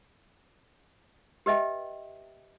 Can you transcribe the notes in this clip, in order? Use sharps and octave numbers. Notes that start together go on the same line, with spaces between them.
G4 B4 D#5 E5 G5